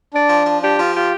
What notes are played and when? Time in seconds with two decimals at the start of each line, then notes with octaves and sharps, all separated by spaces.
0.13 D4 D5
0.30 F3
0.46 F3
0.62 D4 G4
0.78 F3 F4
0.95 F4 G4